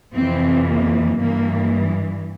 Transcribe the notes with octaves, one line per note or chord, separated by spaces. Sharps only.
F2 C3 E3 C4
A#3
G2 E3 A#3